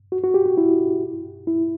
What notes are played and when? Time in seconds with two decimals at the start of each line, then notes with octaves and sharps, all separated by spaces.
0.12 F#4
0.24 F#4
0.34 G4
0.46 F#4
0.57 E4
1.47 E4